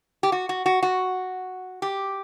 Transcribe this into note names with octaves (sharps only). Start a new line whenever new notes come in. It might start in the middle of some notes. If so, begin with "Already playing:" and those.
G4
F#4
F#4
F#4
F#4
G4